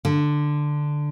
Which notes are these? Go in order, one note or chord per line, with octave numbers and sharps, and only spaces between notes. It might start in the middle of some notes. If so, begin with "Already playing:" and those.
D3